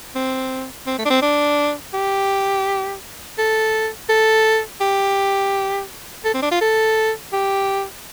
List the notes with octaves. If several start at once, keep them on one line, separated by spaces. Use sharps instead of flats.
C4
C4
A3
D4
C4
D4
G4
A4
A4
G4
A4
C4
D4
F4
A4
G4